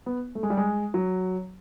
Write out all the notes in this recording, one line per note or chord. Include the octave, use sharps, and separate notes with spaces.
B3
A3
G#3
G3
G#3
F#3